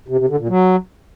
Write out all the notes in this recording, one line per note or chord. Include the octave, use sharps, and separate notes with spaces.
C3
C3
D3
A#2
F#3